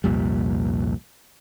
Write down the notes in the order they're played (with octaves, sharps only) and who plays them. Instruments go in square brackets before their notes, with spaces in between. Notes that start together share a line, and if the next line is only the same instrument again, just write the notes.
[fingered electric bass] C2 F2 A#2 G3